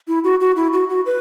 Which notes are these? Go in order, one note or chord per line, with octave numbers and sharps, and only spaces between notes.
E4
F#4
F#4
E4
F#4
F#4
B4